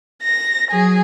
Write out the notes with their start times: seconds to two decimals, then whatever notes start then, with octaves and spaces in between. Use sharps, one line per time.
0.23 A#6
0.70 F#3 G#4